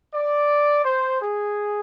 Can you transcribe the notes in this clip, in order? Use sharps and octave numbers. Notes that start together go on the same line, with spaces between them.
D5
C5
G#4